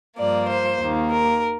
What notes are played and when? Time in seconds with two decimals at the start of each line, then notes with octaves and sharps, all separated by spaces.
0.17 G2 F3 A#3 D5
0.48 C5
0.79 D#2 D#3 A#3
1.09 A#4